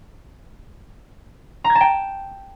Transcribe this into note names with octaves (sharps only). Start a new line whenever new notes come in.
A#5
G#6
A5
G5